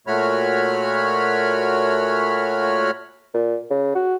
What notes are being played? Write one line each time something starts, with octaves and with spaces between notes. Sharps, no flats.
A#2 A3 F#4 C#5 B5 F6
A#2
C#3
F#4